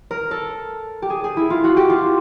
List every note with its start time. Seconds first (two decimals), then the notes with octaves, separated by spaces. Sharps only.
0.11 A#4
0.31 A4
1.02 G4
1.10 G#4
1.24 G#4
1.37 E4
1.50 F4
1.64 F#4
1.77 G4
1.90 F4